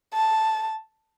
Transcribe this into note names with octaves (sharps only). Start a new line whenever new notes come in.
A5